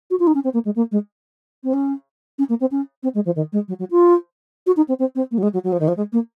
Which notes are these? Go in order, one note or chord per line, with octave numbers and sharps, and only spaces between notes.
F#4
F4
D#4
C#4
C4
A#3
G#3
A#3
G#3
C4
C#4
C#4
A#3
C4
C#4
C4
G#3
F3
D#3
G#3
F#3
F#3
F4
F#4
D#4
C4
C4
C4
A#3
F#3
G#3
F#3
F#3
F3
D#3
F3
G#3
A#3